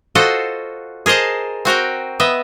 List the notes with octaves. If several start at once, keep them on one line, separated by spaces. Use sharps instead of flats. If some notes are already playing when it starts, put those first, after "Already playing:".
F4 F#4 A4 C5 D#5 F#5
G#4 A#4 C5 D#5 A5
C4 F#4 A#4 G5
B3 D#5 E5